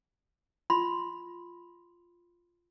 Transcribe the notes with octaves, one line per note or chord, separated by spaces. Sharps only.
F4 B5 C6